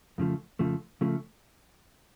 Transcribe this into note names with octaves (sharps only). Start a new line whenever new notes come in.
F2 C#3 F3 A3
F2 C#3 F3 A3
C#3 F3 A3